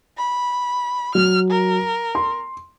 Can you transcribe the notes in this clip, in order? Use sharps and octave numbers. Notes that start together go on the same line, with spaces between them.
B5
F#3 F6
A#4
C6